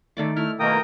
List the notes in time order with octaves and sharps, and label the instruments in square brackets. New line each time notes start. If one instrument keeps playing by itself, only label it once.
[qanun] D#3 D5 D6 [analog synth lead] A3
[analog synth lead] A3 [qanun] E4 [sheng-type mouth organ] F6
[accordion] B2 D#3 A#3 [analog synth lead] A3 [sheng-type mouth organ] A#4 G5 D#6